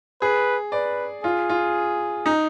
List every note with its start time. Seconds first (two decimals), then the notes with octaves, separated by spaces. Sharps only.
0.22 G#4 B4
0.72 B4 D5
1.24 F4 G#4
1.49 F4
2.26 D#4